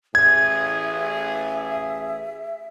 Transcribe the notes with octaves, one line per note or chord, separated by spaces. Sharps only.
A1 G#4 E5 G#6